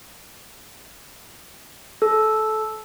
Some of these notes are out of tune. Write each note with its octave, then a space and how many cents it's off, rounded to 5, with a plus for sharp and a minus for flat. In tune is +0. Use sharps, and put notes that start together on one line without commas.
A4 -20 E6 +0